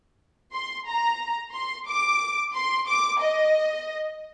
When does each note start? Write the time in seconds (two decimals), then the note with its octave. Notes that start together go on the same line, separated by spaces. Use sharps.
0.54 C6
0.87 A#5
1.53 C6
1.88 D6
2.55 C6
2.88 D6
3.21 D#5